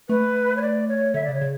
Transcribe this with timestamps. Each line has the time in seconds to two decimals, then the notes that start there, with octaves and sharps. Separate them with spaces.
0.09 A3 B4
0.57 C#5
0.61 D5
0.89 C#5
1.14 D3 E5
1.24 C#3 D5
1.34 C#5
1.41 C#3